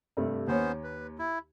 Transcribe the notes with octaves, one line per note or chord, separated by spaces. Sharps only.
G2 C3 A3
D#2 B3 C#4 C5 C#5
B4
E4